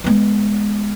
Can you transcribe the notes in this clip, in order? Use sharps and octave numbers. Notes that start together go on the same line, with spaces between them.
G#3 B3